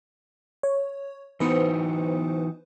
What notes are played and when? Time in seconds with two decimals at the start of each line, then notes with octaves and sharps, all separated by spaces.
0.63 C#5
1.40 E3 B3 D#4 F#4 B4 C5